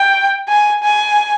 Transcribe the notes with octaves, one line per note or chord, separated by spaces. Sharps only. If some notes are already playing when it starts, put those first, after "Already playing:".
Already playing: G5
G#5
G#5